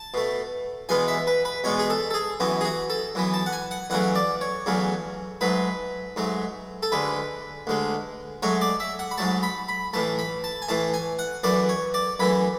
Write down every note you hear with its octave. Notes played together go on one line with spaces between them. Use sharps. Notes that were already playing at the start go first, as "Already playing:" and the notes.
Already playing: A5
B2 A3
E2 B2 G#3 B3 G#5
E5
B4
B4
E2 B2 G#3 B3 C#5
G#4
A4
A4
G#4
F#2 E3 B3 F#4
G#4
F#4
A4
F#2 E3 B3
A5
F#5
G#5
F#5
E2 C#3 F#3 A3 F#5
D5
C#5
E2 C#3 F#3 A3
G#2 F#3 A3 B4
G#2 F#3 A3
A4
D2 D3 G#3 B4
D2 D3 G#3
G#2 F#3 A3 C#5
D5
E5
F#5
B5
G#2 F#3 A3 A5
B5
B5
A2 E3 A3 A5
B5
A5
G#5
A2 E3 A3 A5
G#5
F#5
F#2 E3 A3 D5
C#5
D5
F#2 E3 A3 B5